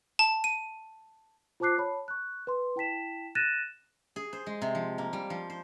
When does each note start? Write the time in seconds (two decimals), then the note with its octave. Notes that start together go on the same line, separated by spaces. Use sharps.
0.19 A5
0.44 D#7
1.60 F4 C5 A5 D6 F#6 C7
1.78 C#5 A5 B5
2.08 C#6 F#6
2.47 B4 C6
2.76 E4 G5 A5 B6 E7
3.35 F#6 A6 A#6 D#7 E7
4.16 G#4
4.33 C5
4.46 G#3
4.62 C3
4.75 F3
4.98 A#3
5.13 G3
5.30 F3
5.50 C5